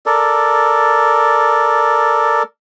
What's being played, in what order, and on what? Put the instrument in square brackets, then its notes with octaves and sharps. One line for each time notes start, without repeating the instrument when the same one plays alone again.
[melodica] A4 A#4 D5